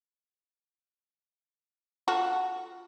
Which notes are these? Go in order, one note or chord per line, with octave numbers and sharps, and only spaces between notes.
F4 F#4 A4